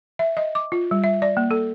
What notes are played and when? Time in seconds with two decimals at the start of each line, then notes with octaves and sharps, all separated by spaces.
0.19 E5
0.37 D#5
0.55 D6
0.72 F4
0.91 G3
1.04 E5
1.22 D5
1.37 A#3
1.51 A4